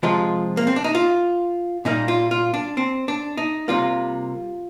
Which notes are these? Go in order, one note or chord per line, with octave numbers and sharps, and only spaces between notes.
C3 F3 G#3 F4
A#3
C4
D4
D#4
F4
A#2 G3 A#3 D#4
F4
F4
D4
C4
D4
D#4
C3 G3 A#3 F4